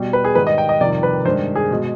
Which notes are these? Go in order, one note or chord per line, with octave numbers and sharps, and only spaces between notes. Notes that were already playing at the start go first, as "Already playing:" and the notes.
Already playing: B2 G3
B4
G#4
G#2 D#3 G3 B4
D#5
G5
D#5
F2 C3 D#3 G3 D5
B4
G2 D#3 G#3 C5
G#4
B2 G#3